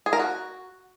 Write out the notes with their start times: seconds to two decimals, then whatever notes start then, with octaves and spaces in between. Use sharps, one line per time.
0.06 G#4
0.13 A#4
0.19 F#4